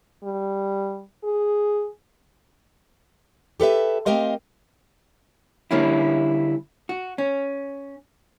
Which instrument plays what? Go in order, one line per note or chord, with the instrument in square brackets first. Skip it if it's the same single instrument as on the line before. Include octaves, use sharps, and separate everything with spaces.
[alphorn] G3
G#4
[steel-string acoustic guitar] G4 A4 B4 E5
A3 C4 G4 A#4 D#5 F5
[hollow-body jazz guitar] D3 G3 A#3 C#4 E4
F#4
C#4